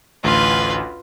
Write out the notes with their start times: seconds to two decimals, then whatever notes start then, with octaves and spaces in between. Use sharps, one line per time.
0.24 A1 D2 F4 B4